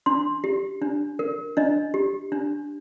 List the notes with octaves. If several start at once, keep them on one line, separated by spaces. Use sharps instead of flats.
D4 C6
G4
D4
A#4
D4 D#5
G4
D4